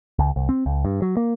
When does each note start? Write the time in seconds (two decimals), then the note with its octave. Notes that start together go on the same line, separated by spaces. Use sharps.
0.19 C#2
0.36 C2
0.49 C4
0.66 C#2
0.85 G2
1.02 F#3
1.17 A#3